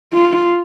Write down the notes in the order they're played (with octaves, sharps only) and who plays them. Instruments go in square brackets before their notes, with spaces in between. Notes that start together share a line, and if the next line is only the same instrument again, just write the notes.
[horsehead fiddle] F4